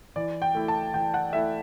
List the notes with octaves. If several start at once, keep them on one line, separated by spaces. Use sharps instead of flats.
E3 D5
G5
A3 E4
A5
E3 G5
F#5
A3 E4 E5